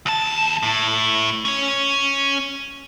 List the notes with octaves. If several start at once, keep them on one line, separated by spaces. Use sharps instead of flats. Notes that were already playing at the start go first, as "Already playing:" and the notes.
D#2 A5
A2
C#4 C#5